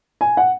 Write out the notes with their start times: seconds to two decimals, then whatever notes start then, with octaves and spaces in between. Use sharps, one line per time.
0.21 G#5
0.37 F#5